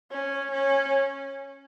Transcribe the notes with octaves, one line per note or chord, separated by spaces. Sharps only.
C#4
C#4